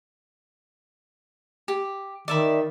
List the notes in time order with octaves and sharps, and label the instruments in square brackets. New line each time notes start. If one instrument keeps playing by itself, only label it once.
[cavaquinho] G4
[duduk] D#3 [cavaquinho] D5 E5 B5